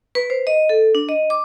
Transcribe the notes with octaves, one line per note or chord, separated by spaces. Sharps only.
B4
C5
D#5
A4
D4
D#5
D6